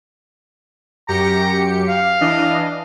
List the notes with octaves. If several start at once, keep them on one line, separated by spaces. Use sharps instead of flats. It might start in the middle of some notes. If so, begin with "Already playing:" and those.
F#2 G4 A#5 C#7
F5
E3 D4 D#5